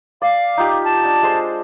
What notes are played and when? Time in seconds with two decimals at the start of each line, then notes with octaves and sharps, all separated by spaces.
0.22 D5 F5
0.58 D#4 F4 G4
0.84 A5
1.05 D4
1.23 G#3 C5